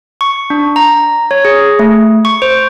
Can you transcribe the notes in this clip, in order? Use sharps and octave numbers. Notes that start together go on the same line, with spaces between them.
C#6
D4
A#5
C#5
G#4
A3
C#6
C5